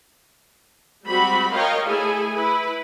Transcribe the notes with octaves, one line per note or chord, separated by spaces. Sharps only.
G3 G#3 C4 F#4 B5
A#4 C#5 D#5 F5 G5
A3 E4 G#4 A4 G#5
E4 B4